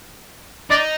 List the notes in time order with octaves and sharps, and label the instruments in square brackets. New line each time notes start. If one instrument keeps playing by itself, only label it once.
[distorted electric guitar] D#4 [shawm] D5